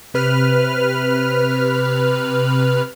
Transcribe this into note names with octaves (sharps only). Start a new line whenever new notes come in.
C3 B4 F6